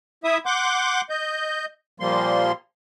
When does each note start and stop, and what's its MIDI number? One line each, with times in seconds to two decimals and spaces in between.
0.24 0.38 64
0.24 0.38 76
0.24 0.38 87
0.46 1.01 78
0.46 1.01 84
0.46 1.01 86
0.46 1.01 91
1.10 1.66 75
1.10 1.66 91
2.00 2.52 46
2.00 2.52 53
2.00 2.52 55
2.00 2.52 58
2.00 2.52 84